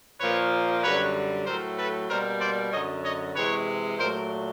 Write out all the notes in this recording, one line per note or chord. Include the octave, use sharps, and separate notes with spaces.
A#2 F3 A#3 B4 C#5
F#2 D3 G3 B4 C#5
A2 F#3 A3 A#4 C5
A4 B4
B2 G3 A#3 A#4 C5
C5 D5
F#2 D3 F#3 C#5 D#5
C#5 D#5
C3 E3 G#3 B4 C#5
A#2 F#3 A3 A#4 C5